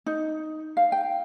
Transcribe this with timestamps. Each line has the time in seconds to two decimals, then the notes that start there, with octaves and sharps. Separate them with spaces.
0.06 D#4
0.77 F5
0.92 G5